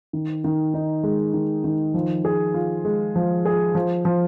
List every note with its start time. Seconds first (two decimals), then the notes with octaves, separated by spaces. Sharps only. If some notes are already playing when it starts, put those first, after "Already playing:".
0.13 D#3
0.44 D#3
0.74 D#4
1.03 G#3
1.34 D#3
1.64 D#3
1.94 F3
2.25 G#4
2.54 F4
2.85 G#3
3.16 F3
3.45 G#4
3.75 F3
4.05 F3